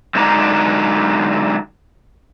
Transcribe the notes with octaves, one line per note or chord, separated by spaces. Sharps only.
D3 F#3 G#3 D4 D#4 A#5